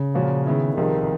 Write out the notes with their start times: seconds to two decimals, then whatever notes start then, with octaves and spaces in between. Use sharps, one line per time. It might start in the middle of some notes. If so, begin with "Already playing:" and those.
Already playing: C#3
0.14 A#2 F3 A#3 C#4 F#4
0.46 D#3 G#3 B3 E4
0.77 C2 C3 D#3 F3 G#3